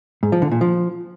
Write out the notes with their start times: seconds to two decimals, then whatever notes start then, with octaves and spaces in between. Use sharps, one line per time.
0.23 G#2
0.32 F3
0.42 D3
0.51 A#2
0.61 F3